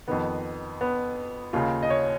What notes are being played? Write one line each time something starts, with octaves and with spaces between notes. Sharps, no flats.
F2 D#3 B3
B3
D#2 C#3 F4
D#5
C#5